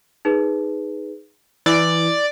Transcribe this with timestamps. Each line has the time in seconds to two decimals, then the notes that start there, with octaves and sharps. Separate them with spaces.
0.25 D#4 G#4 B4
1.66 E3 E4 D5 D6